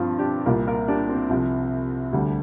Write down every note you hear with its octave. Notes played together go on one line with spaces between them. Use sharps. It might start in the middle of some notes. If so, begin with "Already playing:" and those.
Already playing: G2 F3 C4 F4
D4 G4
C2 A#2 G3 F4 A#4
F4 A#4
D4 G4
C4
C2 C3 F3
D2 D3 G3